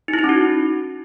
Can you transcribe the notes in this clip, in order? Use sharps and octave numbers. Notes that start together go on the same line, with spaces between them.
D#4
E4
D#4
C#4
F#4